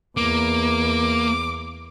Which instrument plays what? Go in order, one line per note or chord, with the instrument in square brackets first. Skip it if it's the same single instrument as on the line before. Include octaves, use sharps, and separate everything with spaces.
[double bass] E2 [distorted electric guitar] A#3 [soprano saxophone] D6